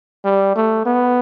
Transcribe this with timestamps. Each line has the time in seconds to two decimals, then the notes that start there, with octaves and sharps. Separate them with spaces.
0.25 G3
0.56 A3
0.86 B3